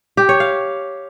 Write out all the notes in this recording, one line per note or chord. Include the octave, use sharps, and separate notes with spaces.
G4
C#5
F5